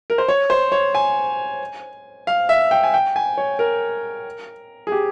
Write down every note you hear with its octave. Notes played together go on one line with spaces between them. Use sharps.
A#4
C5
C#5
C5
C#5
G#5
F5
E5
G5
G#5
G5
G#5
C#5
A#4
G#4
G4